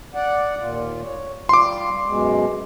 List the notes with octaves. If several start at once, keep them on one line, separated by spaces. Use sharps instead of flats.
D5 F#5
D#2 A#2 F4
C#5
G3 F4 C6 D6
F#2 B2 G#3